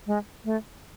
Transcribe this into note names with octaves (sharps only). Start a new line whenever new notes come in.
G#3
A3